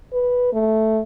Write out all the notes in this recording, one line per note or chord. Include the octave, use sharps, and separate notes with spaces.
B4
A3